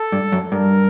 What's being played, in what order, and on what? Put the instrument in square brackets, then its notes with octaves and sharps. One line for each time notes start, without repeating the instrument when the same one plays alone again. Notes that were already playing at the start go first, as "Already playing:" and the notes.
Already playing: [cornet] A4
[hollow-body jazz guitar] G2
F#2
[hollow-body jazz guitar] G2 [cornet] A#4